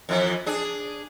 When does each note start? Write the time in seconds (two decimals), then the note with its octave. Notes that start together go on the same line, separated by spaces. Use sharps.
0.09 F2 E3
0.46 D4 G#4